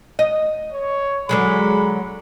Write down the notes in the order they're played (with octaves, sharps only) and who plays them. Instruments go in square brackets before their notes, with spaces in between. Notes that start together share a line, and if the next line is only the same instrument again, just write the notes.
[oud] D#5
[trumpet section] C#5
[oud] D3 F#3 G#3 [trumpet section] F#4 A#5 B5